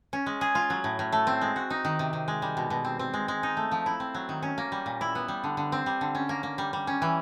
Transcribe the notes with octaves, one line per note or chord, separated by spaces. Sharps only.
C#4
G#3
G#4
F4
F#3
A2
A2
A3
C4
G#3
F#4
D#4
D#3
C3
C3
G#3
G3
B2
B2
C4
C4
G#3
G#3
D#4
A3
F3
E4
C4
F#3
D#3
C#4
A#3
G3
A#2
E4
B3
G3
D3
D3
C4
G3
D3
C#4
A#3
A#3
G3
G3
C#4
E3